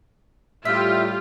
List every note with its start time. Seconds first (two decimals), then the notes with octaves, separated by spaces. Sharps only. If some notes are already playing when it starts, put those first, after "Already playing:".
0.65 A2 G3 F4 G4 E5